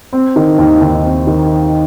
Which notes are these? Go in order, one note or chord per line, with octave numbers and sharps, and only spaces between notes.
C4
D#3
D#2
D#2
C4
D#3